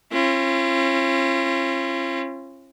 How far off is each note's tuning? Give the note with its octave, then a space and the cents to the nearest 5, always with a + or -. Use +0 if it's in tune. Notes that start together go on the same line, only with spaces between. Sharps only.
C#4 -45 F4 -40